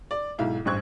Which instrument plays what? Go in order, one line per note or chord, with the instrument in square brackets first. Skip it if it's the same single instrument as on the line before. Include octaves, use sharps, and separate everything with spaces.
[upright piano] D5
B1 G#2 E4 F5
A1 G2 C5 C#6 F#6 G#6